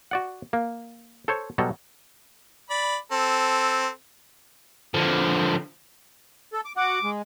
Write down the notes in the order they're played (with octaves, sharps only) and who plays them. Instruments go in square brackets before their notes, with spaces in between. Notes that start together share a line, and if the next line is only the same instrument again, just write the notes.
[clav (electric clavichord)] F#4 D5 F#5
A#3
A4 C5 C#5
B2 F#3 G3 A4 A#5
[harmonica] D5 B5
C4 A4
[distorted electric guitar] D3 F3
[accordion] A4
D6
[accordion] F#4 F#5 [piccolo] D6
[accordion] G#3